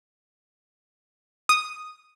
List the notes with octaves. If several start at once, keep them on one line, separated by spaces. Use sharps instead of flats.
D#6